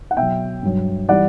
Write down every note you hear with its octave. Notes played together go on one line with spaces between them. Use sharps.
F#5
B2 F#3 E5 G5
G2 F#3
E3 G3 D5 F#5